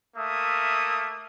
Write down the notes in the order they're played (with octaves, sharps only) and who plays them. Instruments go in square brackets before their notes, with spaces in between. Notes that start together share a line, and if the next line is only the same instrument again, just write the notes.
[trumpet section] A3 A#3 E5 D#6